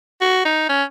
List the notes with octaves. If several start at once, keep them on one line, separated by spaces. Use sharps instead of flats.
F#4
D#4
C#4